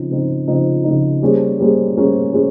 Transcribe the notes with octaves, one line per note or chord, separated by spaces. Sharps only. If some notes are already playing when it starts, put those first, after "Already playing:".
Already playing: C#3 F3 C4 D#4
C#3 F3 C4 D#4
C#3 F3 C4 D#4
C#3 F3 C4 D#4
G3 A#3 C#4 G#4 C5
G3 A#3 C#4 G#4 C5
G3 A#3 C#4 G#4 C5
C#4 G#4 C5